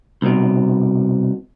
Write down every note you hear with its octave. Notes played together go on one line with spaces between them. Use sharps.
C2 B2